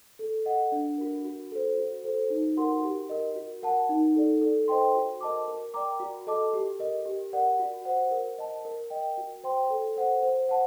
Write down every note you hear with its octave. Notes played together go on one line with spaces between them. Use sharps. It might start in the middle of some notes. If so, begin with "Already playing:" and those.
A4
D#5 F#5
D4
F#4 A#4
F#4
A4 C5
F#4
A4 C5
D#4
F#4 A#4 F#5 C6
G4
A#4 D#5
F#4
A#4 F#5 A5
D#4
A4 D5
A4
C5 D#5 G5 C6
F#4
A#4 D#5 A5 D6
A#4
D5 G5 A#5 D6
F#4
A4 D#5 A5 D6
G4
A#4 D#5
G4
A#4 D5 F#5
F#4
C5 F#5
A#4
D#5 A5
A#4
D#5 G5
F#4
C5 G5 C6
A4
C5 F#5
C5
F#5 A5